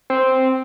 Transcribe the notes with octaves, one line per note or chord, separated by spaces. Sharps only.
C4